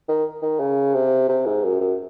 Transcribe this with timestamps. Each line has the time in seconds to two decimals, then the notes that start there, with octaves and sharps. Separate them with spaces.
0.08 D#3
0.42 D#3
0.60 C#3
0.94 C3
1.29 C3
1.46 G#2
1.63 F#2
1.80 F#2